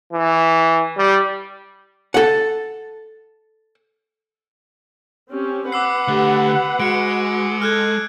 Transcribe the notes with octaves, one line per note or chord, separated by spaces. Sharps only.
E3
G3
A4 F#5
C4 C#4 G4
B4 F#5 D6 E6 C7
D3 A3 G4
G#3 F#4 C#7 D7
A4 F6 F#6 G#6